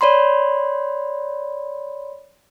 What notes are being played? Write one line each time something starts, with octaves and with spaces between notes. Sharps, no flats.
C#5 D5 B5 C6